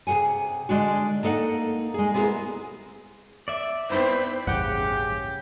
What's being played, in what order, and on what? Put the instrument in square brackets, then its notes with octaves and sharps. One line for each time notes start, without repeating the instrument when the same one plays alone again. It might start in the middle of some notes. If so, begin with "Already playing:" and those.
[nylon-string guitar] C3 G#4 A#4 F#5 G#5
D3 G#3 D4 F#4
A#3 D#4 A4 F5 F#5
G#3 G#4
B3 C4 E4 G4 G#4 A#4
[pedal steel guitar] D5 E5
[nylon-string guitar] B3 D#4 E4 [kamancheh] C4 B5 [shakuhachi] C5
[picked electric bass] A1 E2 G2 [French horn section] C#3 [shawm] G4 [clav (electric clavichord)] F#5 G5